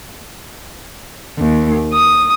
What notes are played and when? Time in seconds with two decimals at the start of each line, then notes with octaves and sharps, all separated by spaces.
1.38 D#2
1.93 D#6